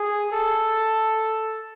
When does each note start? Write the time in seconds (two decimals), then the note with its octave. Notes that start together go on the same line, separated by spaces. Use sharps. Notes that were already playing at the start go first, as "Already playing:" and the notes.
Already playing: G#4
0.32 A4